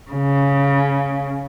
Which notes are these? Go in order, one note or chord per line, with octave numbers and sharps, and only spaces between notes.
C#3